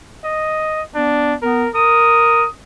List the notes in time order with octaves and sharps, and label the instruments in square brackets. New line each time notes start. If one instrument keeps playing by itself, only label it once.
[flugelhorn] D#5
[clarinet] B3 [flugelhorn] D4
[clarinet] B3 [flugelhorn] A#4
[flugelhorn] A#4 [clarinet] D#6